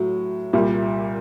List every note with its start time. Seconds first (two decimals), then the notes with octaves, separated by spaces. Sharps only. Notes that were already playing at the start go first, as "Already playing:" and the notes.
Already playing: A2 F#3
0.53 C2 A#2 G3